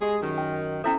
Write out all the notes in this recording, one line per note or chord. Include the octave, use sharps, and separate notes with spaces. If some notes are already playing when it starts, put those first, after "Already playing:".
G#3 G4 G#4 D#5
F#2 D#3
G5
C#4 E4 A4 C5 E5